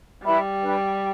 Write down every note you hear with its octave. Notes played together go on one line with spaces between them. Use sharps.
G3 E4 B4 E5 B5
D4 B4 G5